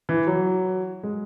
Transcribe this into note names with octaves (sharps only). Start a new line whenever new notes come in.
E3
F#3
G#3